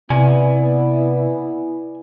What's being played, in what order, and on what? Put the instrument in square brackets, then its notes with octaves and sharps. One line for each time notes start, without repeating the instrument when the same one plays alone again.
[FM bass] C3 [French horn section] B3 E4 [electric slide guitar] D5 G#5